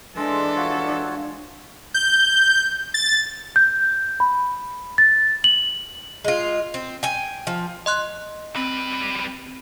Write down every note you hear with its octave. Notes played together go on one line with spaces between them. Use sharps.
E3 G#3 D4 A4
F4 F#4 C#5
G6
A6
G6
B5
A6
F#7
G#3 F4
C4
G5 G#5
F3
D#5 C6 F#6
G3 C4 B4